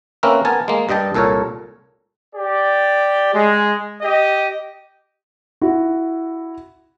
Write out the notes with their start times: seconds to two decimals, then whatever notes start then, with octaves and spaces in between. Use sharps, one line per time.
0.23 A#3 C4 C#4 A#4 B4 E5
0.45 B3 A#4 G#5 A5
0.68 G#3 A#3
0.89 G2 G3 D#5 G5 A5
1.14 C2 A#2 A4 A#4 C#5
2.35 G4 D5
3.33 G#3
4.01 G4 D#5
5.61 E4 F#4